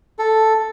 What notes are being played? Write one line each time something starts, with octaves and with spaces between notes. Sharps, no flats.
A4